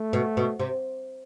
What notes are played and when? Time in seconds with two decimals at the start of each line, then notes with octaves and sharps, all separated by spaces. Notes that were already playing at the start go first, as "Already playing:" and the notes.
Already playing: A3
0.13 B2
0.37 B2
0.60 C3